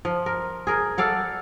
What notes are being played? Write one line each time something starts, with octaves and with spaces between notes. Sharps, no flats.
F3
A#4
G#4 A#4
A4 D5 F5 F#5